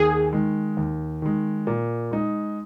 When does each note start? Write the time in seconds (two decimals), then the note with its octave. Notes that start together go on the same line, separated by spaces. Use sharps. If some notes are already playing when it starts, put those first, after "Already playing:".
Already playing: D#2 G#4
0.33 D#3 G#3
0.77 D#2
1.22 D#3 G#3
1.67 A#2
2.11 G#3 D#4